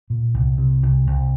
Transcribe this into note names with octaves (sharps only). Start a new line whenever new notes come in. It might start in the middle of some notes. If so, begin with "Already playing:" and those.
A#2
C2
C3
C2
C2